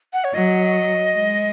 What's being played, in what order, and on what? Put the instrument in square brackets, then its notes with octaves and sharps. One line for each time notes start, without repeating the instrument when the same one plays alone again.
[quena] F#5
C#5
[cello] F#3 [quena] D#5
[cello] G#3